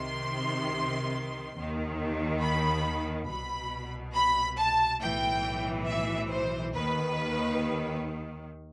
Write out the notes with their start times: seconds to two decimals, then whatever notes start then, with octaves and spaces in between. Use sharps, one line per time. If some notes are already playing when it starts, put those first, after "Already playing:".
Already playing: C2 C3 D#3 C6
1.55 D#2 D#3
2.42 B5
3.28 C2 B2 B5
4.15 B5
4.58 A5
5.01 B1 A2 E3 G5
5.88 E5
6.31 C5
6.74 D#2 D#3 B4